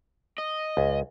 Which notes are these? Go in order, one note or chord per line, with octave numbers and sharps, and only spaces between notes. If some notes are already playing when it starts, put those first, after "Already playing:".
D#5
C#2